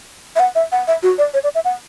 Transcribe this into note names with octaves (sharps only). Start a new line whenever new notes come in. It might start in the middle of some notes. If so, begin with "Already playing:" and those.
E5
F#5
E5
F#5
E5
F#4
D5
C#5
D5
E5
F#5